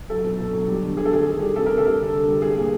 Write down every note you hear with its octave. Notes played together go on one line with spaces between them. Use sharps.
F#3 A4
B2
B2
F#3
G3
D3
D3 G#4
A4
G3 G#4
D#3
G3
C3 A4
C3 A#4
A4
G3
D3
D3
G3
G3 G#4
A#2